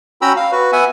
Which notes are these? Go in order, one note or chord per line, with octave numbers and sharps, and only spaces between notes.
C#4 F#4 G5 A#5 B5 E6
F5
F#4 B4
B3 E5 F#5 G#5